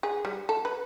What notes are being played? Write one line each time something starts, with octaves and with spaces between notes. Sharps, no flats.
G#4
G3
A4
B4